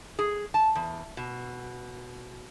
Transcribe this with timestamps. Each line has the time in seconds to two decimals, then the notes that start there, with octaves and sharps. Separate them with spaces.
0.19 G#4
0.54 A5
0.75 E2
1.17 B2